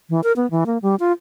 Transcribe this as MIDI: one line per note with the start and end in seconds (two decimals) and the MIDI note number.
0.10 0.21 52
0.24 0.32 70
0.36 0.49 59
0.51 0.64 52
0.66 0.78 58
0.82 0.95 55
1.00 1.12 65